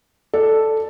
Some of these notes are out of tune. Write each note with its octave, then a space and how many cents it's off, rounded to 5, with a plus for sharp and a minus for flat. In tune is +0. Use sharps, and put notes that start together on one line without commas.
A4 +0 D5 +0